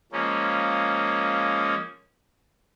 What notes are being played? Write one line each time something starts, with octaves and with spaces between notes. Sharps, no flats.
F3 G#3 A#3 C#4